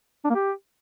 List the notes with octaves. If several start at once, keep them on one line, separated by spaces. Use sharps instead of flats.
D4
A#3
G4